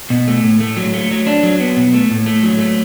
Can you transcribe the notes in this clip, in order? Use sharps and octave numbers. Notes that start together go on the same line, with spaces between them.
B2
A3
A2
A3
F#3
A3
F#3
D4
F#3
B3
B2
A3
A2
A3
F#3
A3